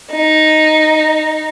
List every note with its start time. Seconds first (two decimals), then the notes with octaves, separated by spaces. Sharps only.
0.12 D#4